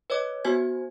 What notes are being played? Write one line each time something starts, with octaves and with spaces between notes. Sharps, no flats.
B4 C#5 D#5 D6
B3 F#4 C5 G#5 G#6